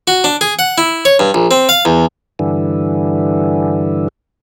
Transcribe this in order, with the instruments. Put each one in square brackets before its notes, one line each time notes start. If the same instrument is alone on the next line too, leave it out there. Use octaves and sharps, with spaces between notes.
[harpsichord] F#4
D4
G#4
F#5
E4
C#5
G2
A#1
C4
F5
E2
[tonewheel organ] G2 D3 E3